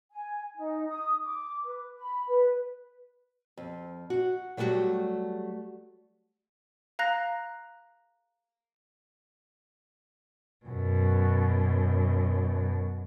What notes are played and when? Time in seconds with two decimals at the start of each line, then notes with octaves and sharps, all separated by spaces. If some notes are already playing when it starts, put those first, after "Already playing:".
0.12 G#5
0.56 D#4
0.88 D#6
1.23 D6
1.65 B4
1.98 B5
2.28 B4
3.57 F2
4.10 F#4
4.57 F#3 G3 A3 B3 F#4 G4
6.99 F5 A#5 F#6 A#6
10.66 F#2 B2